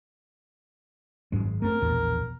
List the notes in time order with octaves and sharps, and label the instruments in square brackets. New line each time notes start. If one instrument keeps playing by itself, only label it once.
[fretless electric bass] G#1 F#2 G#3
[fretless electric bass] A3 C4 [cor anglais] A#4
[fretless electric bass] A#1 E2 B2